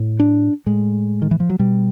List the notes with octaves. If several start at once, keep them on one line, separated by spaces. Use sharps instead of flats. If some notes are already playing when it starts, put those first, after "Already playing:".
Already playing: A2
D4
A2 G#3
D#3
E3
F3
F#3
B2 G3